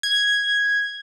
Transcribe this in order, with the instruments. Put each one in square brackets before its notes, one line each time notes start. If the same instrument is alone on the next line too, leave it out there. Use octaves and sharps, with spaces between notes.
[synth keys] G#6